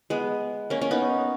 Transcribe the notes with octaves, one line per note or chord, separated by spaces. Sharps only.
G#3 B3
A#3 C#4
A#3 C#4
B3 D#4